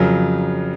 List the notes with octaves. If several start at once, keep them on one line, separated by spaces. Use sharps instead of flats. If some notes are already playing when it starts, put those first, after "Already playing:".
Already playing: F2 C#3 F#3 A#4